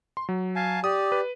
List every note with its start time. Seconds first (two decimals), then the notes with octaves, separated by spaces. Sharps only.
0.17 C6
0.29 F#3
0.56 F5 G#5 A5
0.84 G4 D5 D#6
1.12 B4